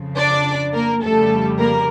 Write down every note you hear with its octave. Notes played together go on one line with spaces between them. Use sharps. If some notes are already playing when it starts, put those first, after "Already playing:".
Already playing: F2 C#3 F3
D4 D5
A#3 A#4
F2 C#3 G3 A3 A4
A#3 A#4